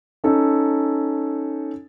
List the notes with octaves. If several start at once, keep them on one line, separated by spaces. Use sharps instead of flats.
C#4 D#4 A4